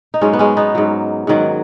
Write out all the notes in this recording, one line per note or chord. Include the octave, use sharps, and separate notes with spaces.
D#4
G#2 F#3 G#3 C#4
B3
G#3 C#4
B3 D#4
G#2 F#3
G#2 D#3 F#3